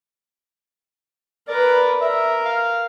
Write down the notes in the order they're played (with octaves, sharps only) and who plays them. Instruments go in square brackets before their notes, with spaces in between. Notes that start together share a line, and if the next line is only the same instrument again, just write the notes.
[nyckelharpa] A#4 B4 [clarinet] D5
[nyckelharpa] A#4 [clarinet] E5
[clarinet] F5